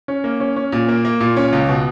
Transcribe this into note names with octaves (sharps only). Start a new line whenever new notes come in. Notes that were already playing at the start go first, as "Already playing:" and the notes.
C#4
A#3
C#4
C#4
A#2
A#3
A#3
A#2
C#4
C#2
B2